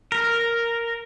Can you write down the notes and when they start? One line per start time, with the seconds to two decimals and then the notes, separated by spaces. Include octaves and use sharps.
0.12 A#4